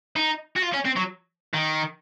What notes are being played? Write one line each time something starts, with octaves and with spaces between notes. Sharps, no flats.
D#4
F#4
F4
C#4
C4
F#3
D#3